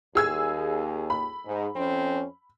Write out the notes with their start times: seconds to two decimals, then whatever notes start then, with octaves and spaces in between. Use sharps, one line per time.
0.15 D#2 G#4 E6 G#6
1.10 B5
1.45 G#2
1.75 F2 C4 C#4